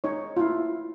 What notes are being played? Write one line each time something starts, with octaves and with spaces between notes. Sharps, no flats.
D#4 C#5
E4 F4